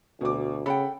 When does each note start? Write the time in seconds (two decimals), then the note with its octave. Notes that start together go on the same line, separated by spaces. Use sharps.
0.21 D2 B2 D6
0.66 C#3 A4 F#5 G5 B5